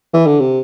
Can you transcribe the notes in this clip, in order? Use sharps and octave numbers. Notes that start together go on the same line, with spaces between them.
E3
D3
C3